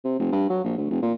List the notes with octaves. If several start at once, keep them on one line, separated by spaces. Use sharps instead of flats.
C3
F1
G2
F#3
A#1
D2
F1
A#2